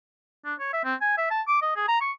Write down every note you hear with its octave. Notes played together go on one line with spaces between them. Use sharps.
D4
C#5
E5
C4
G#5
E5
A5
D6
D#5
G#4
A#5
C#6